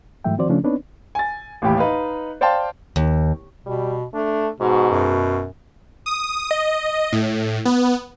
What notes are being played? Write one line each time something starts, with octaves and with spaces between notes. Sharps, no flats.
G#2 E3 F#3 A3 E5 G5
D#3 F3 C4 F#4 C5 D5
C#3 F3 A3 C#4 D4
B3 C4 D4 D#4 B4 C#5
G#5 A6
A1 D#2 A2 G4 B5
D#4 B4 D#5 F5
C5 D5 F5 G5 A5 C6
D#2
B2 G3
A3 D4
G#2 B2 F#4
F#2
D#6
D#5
A2
B3